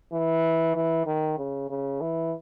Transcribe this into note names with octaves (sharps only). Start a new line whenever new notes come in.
E3
E3
D#3
C#3
C#3
E3